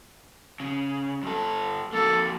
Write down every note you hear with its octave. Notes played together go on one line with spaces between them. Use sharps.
C#3
G2 A4
F2 A#3 A4